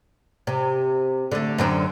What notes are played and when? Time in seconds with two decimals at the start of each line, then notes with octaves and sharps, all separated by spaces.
0.47 C3
1.32 D3 A3
1.58 F#2 D3 C4